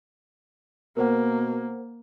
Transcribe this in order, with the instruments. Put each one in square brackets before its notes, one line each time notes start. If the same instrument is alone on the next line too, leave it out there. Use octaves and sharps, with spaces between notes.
[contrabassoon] B2 [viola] A#3 [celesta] A#4 C5 F#5